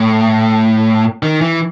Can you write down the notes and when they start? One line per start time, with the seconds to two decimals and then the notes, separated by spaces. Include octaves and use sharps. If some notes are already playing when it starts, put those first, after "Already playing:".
Already playing: A2
1.23 D#3
1.41 E3